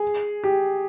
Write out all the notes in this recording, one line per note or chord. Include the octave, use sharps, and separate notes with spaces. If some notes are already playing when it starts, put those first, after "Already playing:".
Already playing: G#4
G4